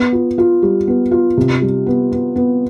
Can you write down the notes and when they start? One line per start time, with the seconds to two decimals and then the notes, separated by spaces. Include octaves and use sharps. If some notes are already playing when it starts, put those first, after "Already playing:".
Already playing: B3
0.12 F4
0.38 F4
0.62 G3
0.87 B3
1.11 F4
1.37 C3
1.61 G3
1.86 B3
2.12 B3
2.36 B3